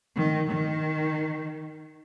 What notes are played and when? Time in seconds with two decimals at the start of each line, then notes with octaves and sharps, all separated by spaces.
0.16 D#3
0.50 D#3